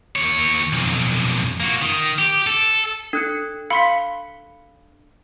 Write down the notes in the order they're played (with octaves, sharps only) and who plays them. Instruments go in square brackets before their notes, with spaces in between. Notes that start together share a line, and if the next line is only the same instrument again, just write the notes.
[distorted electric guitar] D#2 C#5
B1 F2
A#3 F#4
D#3
G4
A4
[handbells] D4 F#6 C#7 [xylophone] A4
[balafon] F5 [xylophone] B5 C6 B6